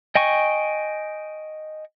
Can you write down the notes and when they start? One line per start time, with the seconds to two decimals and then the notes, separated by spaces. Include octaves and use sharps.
0.15 D#5 G5 G#5 C#6